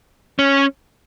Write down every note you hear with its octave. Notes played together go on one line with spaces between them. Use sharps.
C#4